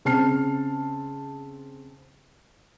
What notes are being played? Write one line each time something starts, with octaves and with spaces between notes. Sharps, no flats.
C#3 C4 A5 F6 C7